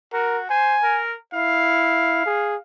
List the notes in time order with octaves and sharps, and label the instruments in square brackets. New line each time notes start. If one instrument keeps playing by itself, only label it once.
[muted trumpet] F#4 [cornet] A#4
[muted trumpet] C5 [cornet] G#5
[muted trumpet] A#4
[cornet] E4 [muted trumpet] F5
[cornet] G#4